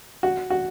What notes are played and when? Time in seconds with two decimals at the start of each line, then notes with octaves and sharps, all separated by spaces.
0.23 F#4
0.50 F#4